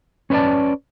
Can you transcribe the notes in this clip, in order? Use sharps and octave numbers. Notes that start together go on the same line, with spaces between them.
C#4 B4 C#5 D5 A5